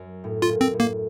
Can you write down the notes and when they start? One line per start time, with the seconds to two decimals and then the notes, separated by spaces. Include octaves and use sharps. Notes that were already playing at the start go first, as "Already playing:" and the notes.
Already playing: F#2
0.24 A2
0.42 F4
0.49 A#2
0.61 C4
0.74 A2
0.80 A#3